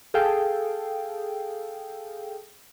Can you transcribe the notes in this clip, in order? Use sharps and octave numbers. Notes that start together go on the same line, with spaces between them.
G#4 A4 F5 G5